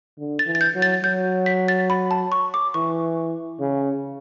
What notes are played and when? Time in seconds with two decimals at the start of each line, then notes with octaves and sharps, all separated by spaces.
0.19 D3
0.39 A6
0.47 E3
0.55 A6
0.61 G6
0.75 F#3
0.82 A6
1.04 F#3 G6
1.46 B6
1.68 A6
1.90 B5
2.11 A5
2.32 C#6
2.54 D6
2.74 E3 C#6
3.60 C#3